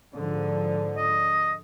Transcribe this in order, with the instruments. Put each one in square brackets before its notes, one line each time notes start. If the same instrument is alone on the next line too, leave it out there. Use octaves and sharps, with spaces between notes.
[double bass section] G#2 D3 F3
[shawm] D#5